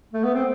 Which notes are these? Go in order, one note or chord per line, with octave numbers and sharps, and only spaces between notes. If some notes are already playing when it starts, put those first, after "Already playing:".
A3
B3
C4